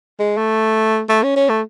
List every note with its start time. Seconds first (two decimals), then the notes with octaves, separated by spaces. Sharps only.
0.19 G#3
0.37 A3
1.09 A3
1.23 C#4
1.36 C#4
1.49 A3